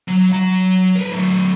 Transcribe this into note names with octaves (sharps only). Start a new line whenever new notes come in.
F#3
F#3 A#5
A#4 B4
F#3 A3